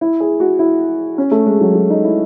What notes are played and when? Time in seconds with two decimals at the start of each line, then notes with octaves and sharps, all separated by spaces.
0.01 E4
0.20 G#4
0.40 F#4
0.59 E4
1.18 C#4
1.31 A3
1.46 G#3
1.61 F#3
1.75 F#3
1.90 D#4
2.04 E4